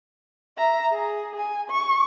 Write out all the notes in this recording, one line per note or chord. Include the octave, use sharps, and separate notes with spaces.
E5 A#5
G#4
G#5
C#6